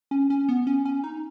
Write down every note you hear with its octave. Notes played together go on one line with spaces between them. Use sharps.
C#4
C#4
B3
C#4
C#4
D#4